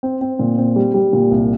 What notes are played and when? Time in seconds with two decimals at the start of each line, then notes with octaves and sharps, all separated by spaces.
0.03 C4
0.21 C4
0.39 A#2
0.58 C4
0.76 G3
0.94 G3
1.13 A#2
1.31 C2